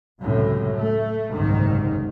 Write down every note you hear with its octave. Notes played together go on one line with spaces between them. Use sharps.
C#2 F#2 A2 C3
A3
F#1 C2 G#2 D#3